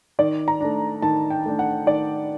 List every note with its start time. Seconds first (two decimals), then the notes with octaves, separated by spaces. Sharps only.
0.19 D#3 D5
0.48 A#5
0.61 A3 D4
1.02 D#3 A5
1.30 G5
1.46 A3 D4
1.59 F#5
1.87 D#3 D5